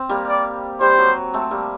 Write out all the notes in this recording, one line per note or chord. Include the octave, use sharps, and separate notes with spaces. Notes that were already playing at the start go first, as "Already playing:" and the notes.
Already playing: C4
G3 A#3
D5
G3 C5
F#3
A3 C4
G3 A#3